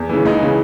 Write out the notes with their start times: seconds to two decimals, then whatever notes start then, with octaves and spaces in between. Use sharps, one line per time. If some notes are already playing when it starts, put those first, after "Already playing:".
Already playing: E2
0.09 C#3 E3
0.25 C#2 D#4
0.40 C#3 E3